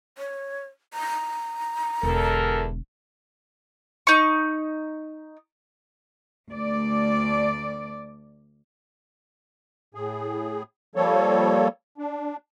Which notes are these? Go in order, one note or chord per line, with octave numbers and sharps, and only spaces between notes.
C#5
A#5
E1 E2 D3 A4 A#4
D#4 C#6
D2 D5
A2 G#4
F3 G3 A#3 A4 C#5
D4